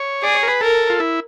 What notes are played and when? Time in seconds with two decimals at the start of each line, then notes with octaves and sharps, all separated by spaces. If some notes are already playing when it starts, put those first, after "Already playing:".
Already playing: C#5
0.22 G#4 D5
0.35 C#5
0.43 A#4
0.48 B4
0.61 A4 A#4
0.90 F4
1.00 E4